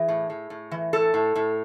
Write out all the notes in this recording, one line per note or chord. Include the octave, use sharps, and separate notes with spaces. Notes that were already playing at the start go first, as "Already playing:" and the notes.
Already playing: E3 G#4
A2
A2
A2
E3
A2 A4
A2
A2